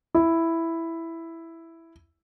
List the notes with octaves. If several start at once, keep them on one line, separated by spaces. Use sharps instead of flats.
E4